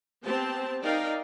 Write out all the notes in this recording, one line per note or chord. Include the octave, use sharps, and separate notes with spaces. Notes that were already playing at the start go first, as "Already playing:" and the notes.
B3 C4 G4 C5 A5
D#4 A#4 D5 F5 G5